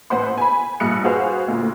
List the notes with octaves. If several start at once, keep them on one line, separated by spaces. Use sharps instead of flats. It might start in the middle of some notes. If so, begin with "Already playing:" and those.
A1 B4 C5 F#5 C6
G#5 B5
A#1 G2 D#6 F#6 C#7
F#4 G#4 B4 C5 F5 G#5
D2 A#2